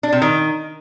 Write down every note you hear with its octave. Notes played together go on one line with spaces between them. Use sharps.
D4
C3
D#3